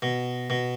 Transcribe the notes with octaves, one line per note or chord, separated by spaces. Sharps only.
B2
B2